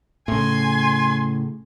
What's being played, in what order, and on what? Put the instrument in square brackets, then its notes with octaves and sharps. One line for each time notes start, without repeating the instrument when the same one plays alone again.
[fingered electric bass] A2 C#3 [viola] G#5 C6